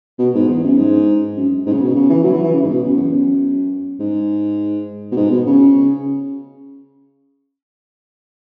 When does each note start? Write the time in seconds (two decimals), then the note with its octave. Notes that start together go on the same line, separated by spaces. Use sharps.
0.19 B2
0.35 G#2
0.48 E2
0.64 F#2
0.77 G#2
1.36 F#2
1.66 G#2
1.73 C#3
1.81 B2
1.95 C#3
2.10 E3
2.24 F#3
2.33 E3
2.43 E3
2.54 C#3
2.63 G#2
2.68 B2
2.83 F#2
2.97 E2
3.12 F#2
4.00 G#2
5.12 B2
5.17 G#2
5.31 B2
5.46 C#3